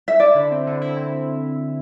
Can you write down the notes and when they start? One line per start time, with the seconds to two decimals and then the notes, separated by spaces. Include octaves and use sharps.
0.08 E5
0.20 E4 D5
0.35 D3
0.51 C4
0.67 D3
0.81 E4
0.97 C4